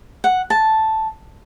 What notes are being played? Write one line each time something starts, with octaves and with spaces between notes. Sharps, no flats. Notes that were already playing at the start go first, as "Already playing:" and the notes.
F#5
A5